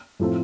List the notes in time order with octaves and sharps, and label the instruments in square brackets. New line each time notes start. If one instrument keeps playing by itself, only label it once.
[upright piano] A2 F3 A3 C4